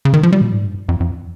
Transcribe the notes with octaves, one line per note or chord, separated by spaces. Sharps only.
C#3
D#3
F3
G3
A#2
G#2
G2
F2
F2